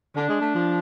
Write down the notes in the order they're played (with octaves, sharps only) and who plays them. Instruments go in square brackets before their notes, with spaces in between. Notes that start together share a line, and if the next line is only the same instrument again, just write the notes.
[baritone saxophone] D3 [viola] D4
[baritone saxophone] G#3
A3
F3